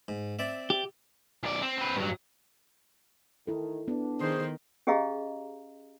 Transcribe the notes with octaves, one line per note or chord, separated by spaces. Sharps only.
G#2
C4 D5 E5
G4
B1 D5
C4
C4 B4
G2 F#3
D#3 E4 A4
B3 D4
D#3 G#4 C5 C6
C#4 G4 G#4 D#5 F5 A#5